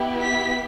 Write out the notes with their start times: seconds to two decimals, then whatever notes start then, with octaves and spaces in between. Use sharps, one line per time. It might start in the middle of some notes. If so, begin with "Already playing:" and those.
Already playing: B3 E4 G4
0.22 B6